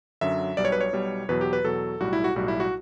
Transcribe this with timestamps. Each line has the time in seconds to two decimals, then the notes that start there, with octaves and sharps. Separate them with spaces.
0.21 F#2 D3 F#3 E5
0.57 B1 B2 G3 D5
0.65 C#5
0.72 B4
0.81 C#5
0.93 B1 B2 G3
1.29 E2 B2 F#3 B4
1.41 G4
1.53 B4
1.64 E2 B2 F#3 A4
2.00 B1 A2 G3 F#4
2.13 E4
2.24 F#4
2.36 B1 A2 G3 F#4
2.48 E4
2.60 F#4